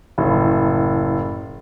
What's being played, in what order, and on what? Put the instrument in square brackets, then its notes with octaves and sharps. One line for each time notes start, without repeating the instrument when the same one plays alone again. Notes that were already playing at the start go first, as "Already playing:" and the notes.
[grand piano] F#1 A2